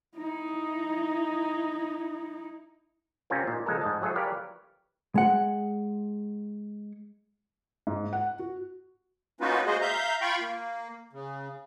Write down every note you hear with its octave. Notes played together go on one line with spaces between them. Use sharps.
D#4 E4
C3 C4 C#4 F4 A#4
A#2 D#4
C#2 F3 G#3 A4 A#4
G#2 D#5 A5
F3 F#3 G#4 A4 C5 E5
G4 A#4 B4 C#5 D5 F5
G#3 F#5
G#2
F#5
F#4
A#3 C#4 D#4 F4 F#4 B4
G#3 A#3 F#4 G#4 C5 D#5
E5 F5 A#5 G6
F4 F5 G5 B5 C#6
A#3
C#3